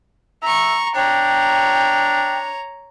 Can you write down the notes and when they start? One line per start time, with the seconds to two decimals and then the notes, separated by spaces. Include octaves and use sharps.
0.43 E5 A#5 C#6
0.95 D4 C#5 G5 A#5